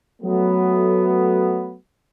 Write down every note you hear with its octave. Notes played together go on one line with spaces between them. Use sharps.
F#3 A3 B3